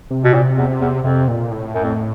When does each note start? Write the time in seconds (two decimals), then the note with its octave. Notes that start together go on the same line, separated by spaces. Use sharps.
0.11 C3
0.24 B2
0.34 A#2
0.58 E2
0.81 E2
1.04 F2 C3
1.28 A#2
1.51 A2
1.75 F#2
1.84 F2